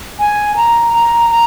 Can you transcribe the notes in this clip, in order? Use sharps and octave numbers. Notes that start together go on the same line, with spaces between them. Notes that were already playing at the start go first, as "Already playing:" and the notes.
G#5
A#5
A#5
A#5